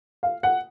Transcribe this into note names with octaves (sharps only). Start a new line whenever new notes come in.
F5
F#5